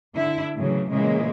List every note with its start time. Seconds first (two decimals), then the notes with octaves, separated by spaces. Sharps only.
0.15 D3 E4
0.58 A2 C#3 E3 F#3
0.90 A#2 C#3 E3 G#3